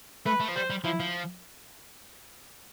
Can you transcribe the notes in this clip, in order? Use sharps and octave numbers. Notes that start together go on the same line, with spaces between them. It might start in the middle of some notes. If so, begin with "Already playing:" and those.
A3 B4
A3
F3
G3 C5
G3
F3 E4
F3